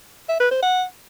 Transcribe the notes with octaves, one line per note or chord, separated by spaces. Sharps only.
E5
B4
C5
F#5